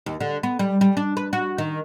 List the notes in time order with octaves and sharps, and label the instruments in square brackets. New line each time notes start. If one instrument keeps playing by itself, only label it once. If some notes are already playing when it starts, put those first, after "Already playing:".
[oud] D#2
D3
B3
G3
G3
D4
B4
F#4
D#3